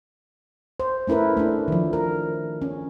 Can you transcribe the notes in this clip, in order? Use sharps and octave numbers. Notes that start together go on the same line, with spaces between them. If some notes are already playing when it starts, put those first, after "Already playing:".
C5
A3 C#4 E4 A#4 B4
A3 D4
D#3 F3
A#4
C#4